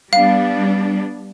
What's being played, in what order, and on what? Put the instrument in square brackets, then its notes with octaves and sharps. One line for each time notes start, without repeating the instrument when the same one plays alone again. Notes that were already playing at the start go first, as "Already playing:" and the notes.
[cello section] G3 B3 D4 [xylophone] F5